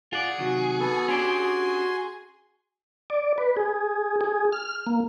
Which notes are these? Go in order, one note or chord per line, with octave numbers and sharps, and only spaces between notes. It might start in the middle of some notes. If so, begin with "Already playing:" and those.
F4 G#4 D5 F#5
C3 D#3 F#3 F#4
B3 A4
C#4 D4 G4 G#5 C6
D5
B4
G#4
G#4
F6
A#3